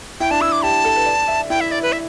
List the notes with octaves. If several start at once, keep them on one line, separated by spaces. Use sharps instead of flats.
E4 G5
D4 A5
E4 E6
D6
G4 A5
A4
B4
D5
E5
E4 G5
E5
D5
B4
E5